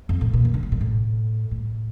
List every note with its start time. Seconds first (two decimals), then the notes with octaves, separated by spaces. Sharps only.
0.09 F2
0.21 A2
0.33 A#2
0.45 E3
0.54 D3
0.63 C#3
0.72 A#2
0.80 A2
1.51 A2